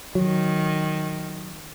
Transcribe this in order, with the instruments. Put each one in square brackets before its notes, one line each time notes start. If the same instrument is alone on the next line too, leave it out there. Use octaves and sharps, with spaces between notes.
[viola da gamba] D#3 [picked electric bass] F#3